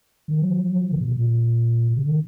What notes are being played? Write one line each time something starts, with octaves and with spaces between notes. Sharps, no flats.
D#3
F#3
F3
F#3
F3
C#3
A#2
B2
A#2
C#3
D#3